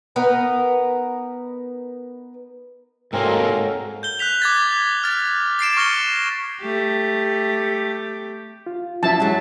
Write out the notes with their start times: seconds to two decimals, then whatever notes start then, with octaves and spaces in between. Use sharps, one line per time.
0.16 B3 D#4 A#4 B4
3.13 G#2 F#3 G#3 A#3 C4 A4 A#4
4.03 G6 G7
4.19 F#6 G6 B6 F7
4.42 D6 G#6 A6
5.04 F6 A6
5.59 A6 C7 D7 E7
5.77 C#6 F6 A#6 C#7 G7
6.61 A3 G4
8.66 F4
9.03 F3 F#3 C#4 E4 E5 A5
9.20 F#3 G#3 A6